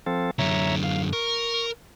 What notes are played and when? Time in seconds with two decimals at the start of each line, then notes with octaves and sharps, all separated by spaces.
0.06 F3 C4 A4
0.39 F#2 D3 C#5 E5 A#5
0.84 F5
1.13 A#4 C#6